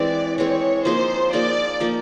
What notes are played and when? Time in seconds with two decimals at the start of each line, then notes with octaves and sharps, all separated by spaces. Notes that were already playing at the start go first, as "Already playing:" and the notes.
Already playing: E3 G#3 C4 D5
0.37 E3 G#3 C4 C#5
0.85 F3 A#3 D#4 G#4 C5
1.33 F3 A#3 D#4 G#4 D5
1.80 F3 A#3 D#4